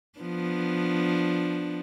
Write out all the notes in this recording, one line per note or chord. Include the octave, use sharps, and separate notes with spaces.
F3 B3 D4